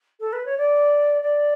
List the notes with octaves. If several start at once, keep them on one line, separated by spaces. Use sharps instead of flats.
A4
B4
C#5
D5
D5